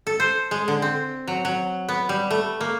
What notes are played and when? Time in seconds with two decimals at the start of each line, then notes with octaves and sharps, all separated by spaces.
0.07 A4
0.20 C5
0.51 G#3
0.68 D3
0.82 C4
1.27 F#3
1.45 F#3
1.89 B3
2.09 G3
2.30 A3
2.61 A#3